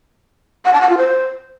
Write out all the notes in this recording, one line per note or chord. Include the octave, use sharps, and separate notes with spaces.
F#5
A5
F#5
F4
C5